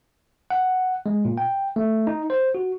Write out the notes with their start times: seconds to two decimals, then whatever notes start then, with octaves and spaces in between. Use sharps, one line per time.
0.50 F#5
1.06 G#3
1.25 A#2
1.38 G5
1.76 A3
2.07 D#4
2.30 C5
2.55 F#4